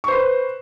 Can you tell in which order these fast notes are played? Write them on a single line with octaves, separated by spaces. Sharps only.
C#6 C5 B4